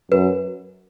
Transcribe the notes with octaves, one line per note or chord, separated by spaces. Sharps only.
F#2 B4